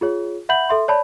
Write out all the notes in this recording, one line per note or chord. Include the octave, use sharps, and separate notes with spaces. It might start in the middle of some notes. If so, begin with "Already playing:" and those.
F4 G#4 C#5
E5 F#5 B5 G6 F#7
A4 E5 C6
C#5 D5 A5 B5